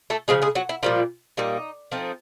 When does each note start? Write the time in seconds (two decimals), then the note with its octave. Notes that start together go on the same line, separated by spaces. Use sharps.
0.10 A3 A4
0.28 C#3 F3 G#3 G#4
0.42 G#3 G#4
0.55 F#3 F#4
0.69 E4
0.83 A#2 F3 G3 A#3 F4
1.37 A#2 G3 A#3 D#4
1.92 F3 A3 C4 D#4